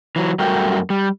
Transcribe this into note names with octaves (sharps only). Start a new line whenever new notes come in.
E3 F#3
F#2 G3 A3 F#4 A#4 G5
G3